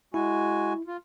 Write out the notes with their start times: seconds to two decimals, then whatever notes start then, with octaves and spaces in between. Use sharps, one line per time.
0.14 G#3 E4 F#4 G#5
0.87 F4